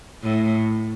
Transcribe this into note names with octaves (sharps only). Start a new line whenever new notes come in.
A2